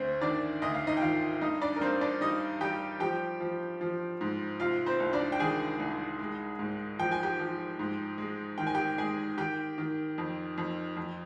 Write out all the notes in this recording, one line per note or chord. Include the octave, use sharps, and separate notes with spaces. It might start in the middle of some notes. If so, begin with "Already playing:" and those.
Already playing: D2 C4 C5
D#3 D4 D5
D2 D#5
F5
D#4 D#5
G5
D#3 F4 F5
G2 D#4 D#5
D4 D5
A#4
G2 C4 C5
D4 D5
G3 D#4 D#5
G3 G4 G5
F3 G4 G5
F3
F3
G#2
C3 F4 F5
C4 C5
C2
D4 D5
G5
D#3 G#4 G#5
C2
G#3
G#2
F3 G5
G#5
G4 G5
F3
G#2
G#3
D#3 G5
G#5
G4 G5
G#3 G#4 G#5
D#3 G4 G5
D#3
F2
F2
F2